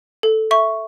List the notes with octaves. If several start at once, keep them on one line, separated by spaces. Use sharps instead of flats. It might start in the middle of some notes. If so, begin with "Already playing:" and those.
A4
E5 C#6